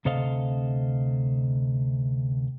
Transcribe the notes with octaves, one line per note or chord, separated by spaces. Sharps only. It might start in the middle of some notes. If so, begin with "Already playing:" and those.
D2 C3 A4 C5 D#5 F5